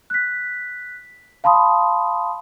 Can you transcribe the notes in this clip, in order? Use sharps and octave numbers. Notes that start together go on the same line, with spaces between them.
F#6 B6
F5 A5 B5 C6 D#6